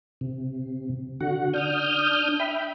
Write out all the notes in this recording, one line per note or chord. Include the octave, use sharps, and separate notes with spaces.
C3
D3 F#4 F#5
D4 D#6 F6 G6
E5 G5 B5